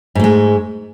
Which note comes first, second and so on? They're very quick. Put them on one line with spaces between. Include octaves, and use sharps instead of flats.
G#2 A3 G#3